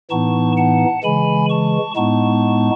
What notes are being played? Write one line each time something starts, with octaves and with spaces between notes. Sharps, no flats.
A2 E3 B3 D#4 A5 C#6
F#5 A5
C#3 E3 G#3 G#5 B5
A5 C#6
A2 G#3 B3 D#4 A5 C#6